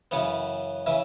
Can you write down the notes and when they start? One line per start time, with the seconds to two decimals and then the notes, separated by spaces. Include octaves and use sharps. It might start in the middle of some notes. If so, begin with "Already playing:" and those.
0.11 F#2 C#3 E3 B3 F#5
0.86 C#3 E3 E5